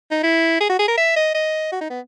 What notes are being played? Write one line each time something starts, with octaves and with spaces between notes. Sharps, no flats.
D#4
E4
G#4
F#4
G#4
A#4
E5
D#5
D#5
F#4
D#4
B3